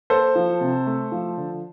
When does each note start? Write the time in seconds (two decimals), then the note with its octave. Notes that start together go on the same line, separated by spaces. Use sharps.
0.10 A#3 A4 C5
0.36 F3
0.61 C3
0.86 A3
1.12 F3
1.37 D3